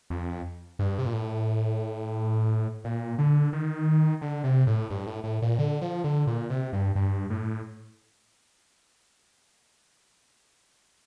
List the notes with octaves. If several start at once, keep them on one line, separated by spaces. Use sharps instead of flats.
F2
G2
C3
A#2
A2
A#2
D3
D#3
D3
C3
A2
G2
A2
A2
A#2
D3
F3
D3
A#2
C3
G2
G2
A2